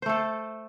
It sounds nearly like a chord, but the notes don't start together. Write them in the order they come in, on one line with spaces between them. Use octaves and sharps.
C5 A3 A4